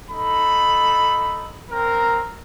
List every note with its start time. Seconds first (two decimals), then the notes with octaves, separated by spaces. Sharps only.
0.10 D#4 A4 B5
1.70 C4 A#4